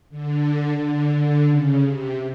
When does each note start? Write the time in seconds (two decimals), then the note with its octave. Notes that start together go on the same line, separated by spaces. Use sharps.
0.10 D3
0.79 D3
1.13 D3
1.48 C#3
1.82 C3